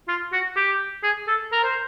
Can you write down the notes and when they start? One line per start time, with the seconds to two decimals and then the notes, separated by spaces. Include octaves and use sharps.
0.08 F4
0.32 F#4
0.56 G4
1.03 G#4
1.27 A4
1.52 A#4
1.63 C5